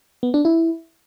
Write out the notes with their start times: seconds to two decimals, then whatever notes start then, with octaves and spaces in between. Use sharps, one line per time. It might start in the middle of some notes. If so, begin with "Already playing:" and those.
0.23 B3
0.34 D4
0.45 E4